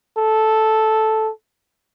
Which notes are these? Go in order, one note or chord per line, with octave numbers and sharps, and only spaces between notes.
A4